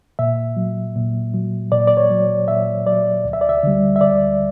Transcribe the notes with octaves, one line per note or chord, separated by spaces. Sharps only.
A#2 E5
F#3
A#2
F#3
A#2 D5
D5
C#5
F#3
A#2 E5
F#3 D5
D2
E5
D5
E5
D3 G3
E5
D2 D5